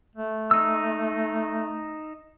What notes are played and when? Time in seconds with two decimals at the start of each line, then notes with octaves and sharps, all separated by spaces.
0.16 A3
0.51 D#4 E6